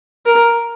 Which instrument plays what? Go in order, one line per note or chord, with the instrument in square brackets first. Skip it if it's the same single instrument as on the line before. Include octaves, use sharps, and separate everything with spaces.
[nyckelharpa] A#4